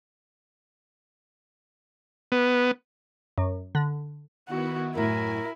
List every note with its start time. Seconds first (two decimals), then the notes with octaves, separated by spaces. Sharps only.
2.32 B3
3.38 F#2
3.75 D3
4.48 D#3 B3 E4 F#4
4.95 F#2 A2 E4 A#4 G#5